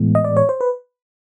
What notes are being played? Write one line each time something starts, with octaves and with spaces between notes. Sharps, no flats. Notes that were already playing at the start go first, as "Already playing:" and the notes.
Already playing: A2 E3 G#3 B3
D#5
D5
C#5
C5
B4